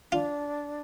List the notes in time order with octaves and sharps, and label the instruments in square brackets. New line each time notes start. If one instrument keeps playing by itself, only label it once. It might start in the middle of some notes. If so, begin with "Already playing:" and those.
[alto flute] D4 [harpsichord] F4